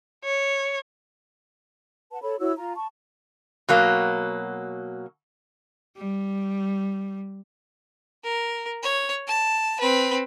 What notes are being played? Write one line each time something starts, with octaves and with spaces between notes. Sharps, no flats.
C#5
B4 F#5 A5
A4 C#5 B5
E4 F#4 C#5 E6
F4 A#5
A5 C#6
B2 F#3 A#3
G3
A#4
C#5
A5
C4 B4